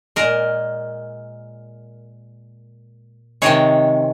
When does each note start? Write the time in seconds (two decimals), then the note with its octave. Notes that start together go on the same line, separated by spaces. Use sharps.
0.16 A#2 G#3 A#4
3.42 C3 D#3 G#3 C#5